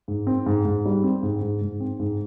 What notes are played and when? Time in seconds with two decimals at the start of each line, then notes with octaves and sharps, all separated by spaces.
0.08 G#2
0.27 C4
0.46 G#2
0.65 G#2
0.85 G3
1.04 C4
1.23 G#2
1.42 G#2
1.61 G#2
1.80 C4
2.00 G#2